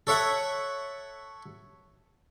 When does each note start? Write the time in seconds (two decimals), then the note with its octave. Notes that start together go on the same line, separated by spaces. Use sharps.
0.07 A4 C#5 E5 F#5